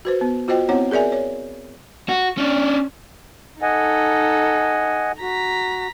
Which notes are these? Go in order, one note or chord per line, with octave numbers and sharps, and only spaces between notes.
F#4 B4 C5
B3
F4 F#4 C5 D#5 G5
B3 C4 E4 C#5 F#5
G#4 A#4 D5 E5 G#5
C#5
F#4
C#4 D4
D#4 A4 D#5 F#5 G#5
F#4 A#5 B6